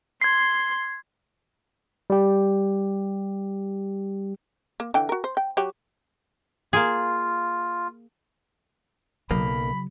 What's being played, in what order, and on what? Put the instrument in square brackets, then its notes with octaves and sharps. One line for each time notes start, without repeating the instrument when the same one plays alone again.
[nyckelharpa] C6 [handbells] G#6 C7
[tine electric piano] G3 G4
[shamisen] A#3
D3 E3 G5
F#4 A#4
C5
G5
F#3 F#4 G4
[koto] A#3 G#4 [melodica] F4
[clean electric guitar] B1 A#3 [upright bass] C#3 F#3 [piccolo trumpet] B5